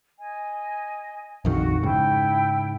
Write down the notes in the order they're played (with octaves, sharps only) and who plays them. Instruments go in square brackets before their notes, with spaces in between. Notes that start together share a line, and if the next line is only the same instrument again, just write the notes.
[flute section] D#5 G#5
[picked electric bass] A#1 F2 D#3 [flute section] F#4
[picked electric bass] G#2 C#3 [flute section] E4 G5